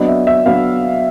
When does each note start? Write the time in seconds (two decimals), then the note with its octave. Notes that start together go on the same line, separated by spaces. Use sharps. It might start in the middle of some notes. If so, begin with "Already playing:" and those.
Already playing: F#3 B3 D4 D#5
0.08 E5
0.27 E5
0.45 F#3 B3 D4 F5